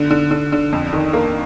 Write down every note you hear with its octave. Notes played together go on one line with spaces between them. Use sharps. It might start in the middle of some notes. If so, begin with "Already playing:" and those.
Already playing: D3
D3
D3
D3
F2
D#3
A#3